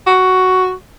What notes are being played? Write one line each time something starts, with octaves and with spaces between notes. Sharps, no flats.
F#4